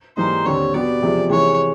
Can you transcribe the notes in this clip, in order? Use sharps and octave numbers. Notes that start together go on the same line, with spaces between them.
G#2 E3 G3 A#3 D#4 C5
D#2 D3 G3 C4 C#5
B2 G3 B3 D5
E2 C3 F3 G#3
C3 E3 G#3 C#5